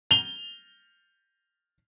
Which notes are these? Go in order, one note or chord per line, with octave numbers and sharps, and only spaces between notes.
F7 G7